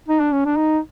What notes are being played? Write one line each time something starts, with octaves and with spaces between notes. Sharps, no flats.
D#4
D4
C#4
D4
D#4